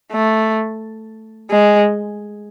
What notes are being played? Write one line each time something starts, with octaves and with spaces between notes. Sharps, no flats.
A3
G#3